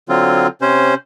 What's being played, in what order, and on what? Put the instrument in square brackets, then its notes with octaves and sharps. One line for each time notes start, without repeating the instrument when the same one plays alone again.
[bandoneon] D3 F#3 C4 F4
C3 C#4 C5